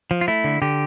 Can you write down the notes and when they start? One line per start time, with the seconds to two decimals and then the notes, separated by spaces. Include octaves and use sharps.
0.11 F3
0.21 F4
0.28 A3 E4
0.44 D3
0.62 D3 G4